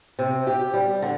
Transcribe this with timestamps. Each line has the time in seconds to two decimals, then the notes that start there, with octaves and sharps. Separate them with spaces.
0.19 C3
0.47 G4
0.74 G3
1.02 D3